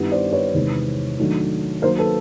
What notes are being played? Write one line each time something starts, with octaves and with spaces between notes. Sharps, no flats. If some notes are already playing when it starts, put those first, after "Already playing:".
Already playing: G2 D#3 G3 B3 E4
C5 D5
B4 C#5
E2 C3 D#3 G#3
D#3 F#3 A3 D4
D#3 F#3 A#3 A#4 C5
A4 B4